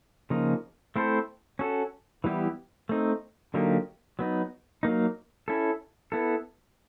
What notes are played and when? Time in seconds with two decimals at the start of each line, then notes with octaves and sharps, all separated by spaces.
0.30 C#3 F3 A#3 D#4
0.96 A3 C4 E4 A4 C5
1.59 C#4 F#4 A4
2.24 E3 G3 B3 E4 G4
2.89 A3 C4 D#4
3.54 D3 F#3 A#3 D#4 G4
4.19 F#3 B3 D#4
4.83 F#3 A#3 D#4
5.48 C#4 E4 A4
6.12 B3 E4 A4